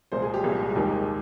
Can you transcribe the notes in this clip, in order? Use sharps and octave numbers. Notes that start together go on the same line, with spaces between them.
C2 A#2 G#3 C5
G#4
G4
C2 A#2 G#3
D#2 D#3 G#3 G4